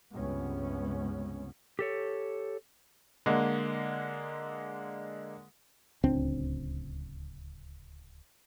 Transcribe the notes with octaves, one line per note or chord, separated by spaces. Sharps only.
C#2 G2 C3 G#3 B3 C#4
G4 A4 C#5
D3 G#3 A#3
D1 C#2 C4 D4